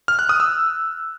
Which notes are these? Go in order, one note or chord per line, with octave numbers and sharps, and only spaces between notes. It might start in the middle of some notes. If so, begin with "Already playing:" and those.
F6
F#6
D#6
E6